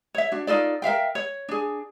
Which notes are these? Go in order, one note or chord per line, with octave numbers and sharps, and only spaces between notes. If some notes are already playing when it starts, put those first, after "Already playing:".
C#5 E5
D4 F#4
D#4 F4 A4 D5
A#4 E5 F5 G5
C#5
D4 G#4